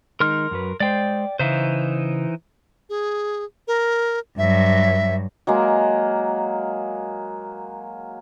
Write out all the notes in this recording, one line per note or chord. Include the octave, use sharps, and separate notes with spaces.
D#3 G#3 D#4 A#4 C6 F6
F#2 F#3 B4
G#3 C5 D5 G5
C#3 E3 D#4 C5 E5 F5
G#4
A#4
G2 F#3 E5
F#3 G#3 A#3